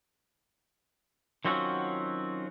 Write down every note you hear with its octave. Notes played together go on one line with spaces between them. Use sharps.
D#3 F#3 C4 C#4 F4 F#4